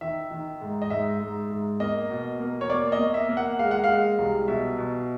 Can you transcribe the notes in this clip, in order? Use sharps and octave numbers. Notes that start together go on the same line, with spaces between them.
D#3 E5
D#3
G#2
D#5
G#2 E5
G#2
G#2
A#3 D#5
B2
A#3
C#5
A#3 D5
D#5
A#3
E5
A#3
F#5
G#3 F5
F#5
F5
G#3
C2
B2 E5
B2